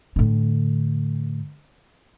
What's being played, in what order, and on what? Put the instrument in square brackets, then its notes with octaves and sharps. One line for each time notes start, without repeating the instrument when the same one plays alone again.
[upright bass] A2 D3